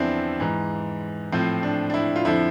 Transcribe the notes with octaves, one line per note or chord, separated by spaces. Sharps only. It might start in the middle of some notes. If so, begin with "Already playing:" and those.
Already playing: E2 D3 F3 C4 D4 E4
G#2 E3
A2 F3 C4
D4
D4
E4
F4
F2 D3 F3 E4